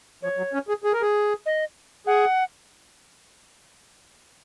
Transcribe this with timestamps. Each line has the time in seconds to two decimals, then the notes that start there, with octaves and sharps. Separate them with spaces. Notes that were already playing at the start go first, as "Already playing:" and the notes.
0.23 F3 C#5
0.37 F#3
0.53 C#4
0.68 G#4
0.84 G#4
0.93 A#4
1.02 G#4
1.46 D#5
2.07 G#4 F#5